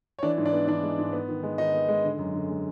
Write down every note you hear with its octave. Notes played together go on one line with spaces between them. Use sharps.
C#5
E3 D4 D5
G#2
D4 D5
B3
E3 D4 D5
G#3
G#2
B3
D#3
G#3
D#3 D#4 D#5
B3
G#3
D3
F#2
D3
G#3